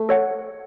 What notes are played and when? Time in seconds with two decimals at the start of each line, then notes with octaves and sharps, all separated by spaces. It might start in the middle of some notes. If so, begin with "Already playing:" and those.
Already playing: A3
0.09 A4 C#5 F#5